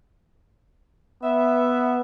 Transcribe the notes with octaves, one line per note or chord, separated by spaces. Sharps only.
B3 E5